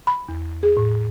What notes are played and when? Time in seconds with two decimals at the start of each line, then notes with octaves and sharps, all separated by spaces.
0.07 B5
0.28 E2
0.63 G#4
0.77 A2